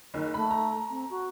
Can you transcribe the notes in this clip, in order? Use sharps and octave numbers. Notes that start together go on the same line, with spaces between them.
F#1 D#3
A3 B5
A#5
C4
F#4